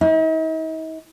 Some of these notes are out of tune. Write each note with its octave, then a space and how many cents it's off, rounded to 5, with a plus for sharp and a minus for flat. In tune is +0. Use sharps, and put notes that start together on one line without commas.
D#4 +45